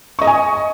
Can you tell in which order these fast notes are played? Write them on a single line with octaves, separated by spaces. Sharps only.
C#6 D#5 D#6 G#5